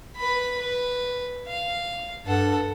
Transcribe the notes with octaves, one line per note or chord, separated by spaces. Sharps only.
B4 B5
B4
F5
G2 A4 F#5